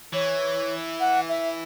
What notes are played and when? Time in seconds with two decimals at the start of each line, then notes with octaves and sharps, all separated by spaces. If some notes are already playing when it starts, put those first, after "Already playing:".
0.13 E3 C#5
1.00 F#5
1.29 E5